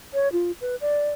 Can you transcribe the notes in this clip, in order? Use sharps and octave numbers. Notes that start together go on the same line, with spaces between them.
C#5
F4
B4
D5